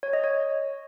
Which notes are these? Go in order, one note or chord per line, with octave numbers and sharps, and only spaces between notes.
C#5
D#5
C#5